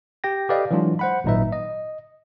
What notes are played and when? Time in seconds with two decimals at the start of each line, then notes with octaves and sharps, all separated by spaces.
0.24 G4 G5 A#6
0.49 G4 A4 B4 D5 D#5 F5
0.71 E3 F#3 G#3 D4 F4
0.99 C5 F#5 B5
1.24 G#1 A#2 F#3 D#4 B4 E5
1.52 D#5